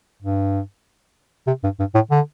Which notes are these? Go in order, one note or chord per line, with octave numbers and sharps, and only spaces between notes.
G2
C3
G2
G2
A2
D3